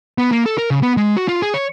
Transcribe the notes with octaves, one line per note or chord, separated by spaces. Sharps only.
B3
A#3
A4
A#4
C#3
B3
G#3
F#4
F4
G#4
C#5